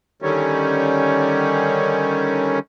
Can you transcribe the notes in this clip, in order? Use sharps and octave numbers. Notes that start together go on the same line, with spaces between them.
D3 D#3 G3 C#4